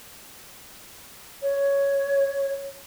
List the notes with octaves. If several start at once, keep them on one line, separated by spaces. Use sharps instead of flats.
C#5